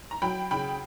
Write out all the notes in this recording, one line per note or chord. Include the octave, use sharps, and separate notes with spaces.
A#5
F#3 G5 B5
C#3 G5 B5